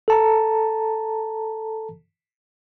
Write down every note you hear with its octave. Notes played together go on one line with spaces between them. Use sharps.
A4 A5 A#5